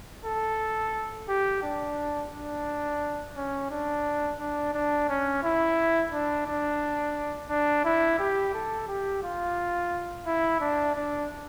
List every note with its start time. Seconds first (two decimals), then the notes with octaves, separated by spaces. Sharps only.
0.25 A4
1.28 G4
1.63 D4
2.32 D4
3.36 C#4
3.70 D4
4.39 D4
4.73 D4
5.09 C#4
5.43 E4
6.12 D4
6.46 D4
7.50 D4
7.84 E4
8.19 G4
8.54 A4
8.88 G4
9.23 F4
10.26 E4
10.60 D4
10.96 D4